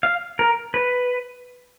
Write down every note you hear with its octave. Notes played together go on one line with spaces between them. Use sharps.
F5
A#4
B4